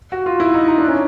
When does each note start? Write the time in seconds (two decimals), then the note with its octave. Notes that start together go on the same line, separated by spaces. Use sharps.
0.12 F#4
0.26 F4
0.40 E4
0.54 D#4
0.68 D#4
0.78 D4
0.88 C#4